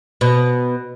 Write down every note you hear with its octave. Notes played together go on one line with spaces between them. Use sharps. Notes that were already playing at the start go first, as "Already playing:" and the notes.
B2